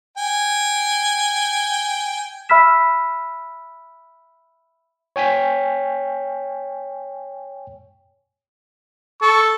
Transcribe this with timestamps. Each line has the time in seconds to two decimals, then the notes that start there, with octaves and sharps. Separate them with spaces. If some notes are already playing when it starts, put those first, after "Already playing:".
0.18 G5 G#5
2.49 E5 B5 E6 F6 B6 E7
5.16 C#5 G5 G#5 B6
9.22 A4 C#6